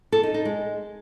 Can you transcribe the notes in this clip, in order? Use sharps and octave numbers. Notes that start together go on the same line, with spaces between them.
A4
D#4
D#4
G#3